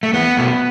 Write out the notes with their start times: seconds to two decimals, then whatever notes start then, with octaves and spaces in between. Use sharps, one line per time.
0.03 A3
0.13 E2 B3
0.37 B2 A3